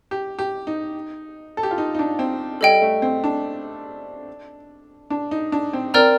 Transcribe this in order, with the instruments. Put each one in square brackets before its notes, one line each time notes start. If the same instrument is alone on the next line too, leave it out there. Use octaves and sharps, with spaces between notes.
[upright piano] G4
G4
D#4
A4
G4
F4
D#4
D#4
D4
C4
[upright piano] G3 [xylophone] A4 D#5 G5
[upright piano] A3
C4
D4
D4
D#4
D4
C4
[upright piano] C4 [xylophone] A#4 D5 G5 A#5 F6